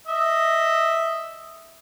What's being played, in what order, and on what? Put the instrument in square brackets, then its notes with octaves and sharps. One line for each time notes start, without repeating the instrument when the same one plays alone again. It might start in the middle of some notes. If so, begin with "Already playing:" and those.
[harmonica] D#5 E5